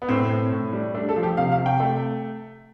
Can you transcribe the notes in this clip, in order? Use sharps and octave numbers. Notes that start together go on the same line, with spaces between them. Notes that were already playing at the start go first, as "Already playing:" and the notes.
B3
A2 C4
A2
A2
G3
A3 D4
A4
F3
G4
C3 F5
F5
C3
G5
A3